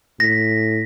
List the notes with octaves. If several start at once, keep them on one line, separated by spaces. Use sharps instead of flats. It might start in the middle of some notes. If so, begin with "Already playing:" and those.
A2 A#6 B6